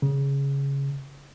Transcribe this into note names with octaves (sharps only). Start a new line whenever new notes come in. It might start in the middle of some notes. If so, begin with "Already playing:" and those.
C#3